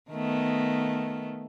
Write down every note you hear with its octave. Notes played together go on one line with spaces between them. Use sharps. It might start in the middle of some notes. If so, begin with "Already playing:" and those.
D#3 A3 B3